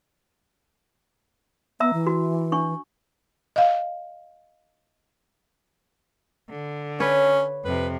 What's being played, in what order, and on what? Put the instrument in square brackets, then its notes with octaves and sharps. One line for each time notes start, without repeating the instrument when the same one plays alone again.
[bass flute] B3 [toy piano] E5 A#5 E6
[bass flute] E3
[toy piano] F#4
D4 C#6
[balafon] D#5 F5
[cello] D3
[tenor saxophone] C#4 [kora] B4 C#5
[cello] F2 C3 [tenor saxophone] B4